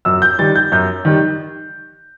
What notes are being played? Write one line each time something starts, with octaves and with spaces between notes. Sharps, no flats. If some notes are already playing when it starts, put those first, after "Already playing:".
F#2 E6
G6
D#3 G3 A6
G6
F#2 G6
D#3 G3